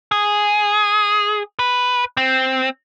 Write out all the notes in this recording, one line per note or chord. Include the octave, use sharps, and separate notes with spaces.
G#4
B4
C4